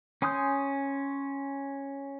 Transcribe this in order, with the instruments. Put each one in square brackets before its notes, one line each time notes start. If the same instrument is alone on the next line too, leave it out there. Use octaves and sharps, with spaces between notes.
[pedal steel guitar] C#4 G#5 C6 D#6 G6